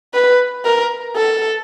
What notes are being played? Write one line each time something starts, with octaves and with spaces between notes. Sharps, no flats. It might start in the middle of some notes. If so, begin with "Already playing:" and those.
B4
A#4
A4